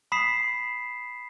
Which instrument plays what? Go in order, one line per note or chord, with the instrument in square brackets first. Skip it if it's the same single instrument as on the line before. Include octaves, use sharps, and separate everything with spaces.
[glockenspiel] B5 D#6 B6 C7 E7